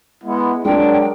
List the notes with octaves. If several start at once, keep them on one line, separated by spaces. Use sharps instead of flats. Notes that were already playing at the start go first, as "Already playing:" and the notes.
G#3 B3 E4
F#3 G#3 D4 A#4 G5